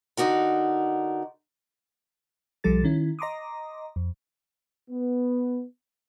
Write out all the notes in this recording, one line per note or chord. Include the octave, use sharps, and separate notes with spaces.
D3 D#4 F#4 A#4
B1 F3 G3 A4 A6
D#3 C#4 E4
D#5 A#5 C6 D6 D#6
F2
B3